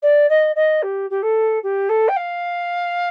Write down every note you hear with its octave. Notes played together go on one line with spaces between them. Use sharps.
D5
D#5
D#5
G4
G4
A4
G4
A4
G5
F5